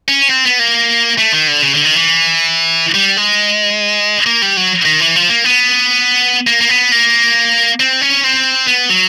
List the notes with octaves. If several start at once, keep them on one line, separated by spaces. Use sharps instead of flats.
C#4
C4
B3
A#3
A3
D#3
D3
C#3
D3
D#3
E3
G3
G#3
A#3
G3
F#3
D#3
E3
F3
A#3
B3
A#3
A#3
B3
A#3
C4
C#4
C4
B3
F#3